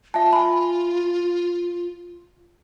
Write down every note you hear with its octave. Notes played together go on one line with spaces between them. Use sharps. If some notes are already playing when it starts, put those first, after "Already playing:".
F4 E5 A5
G#5 B5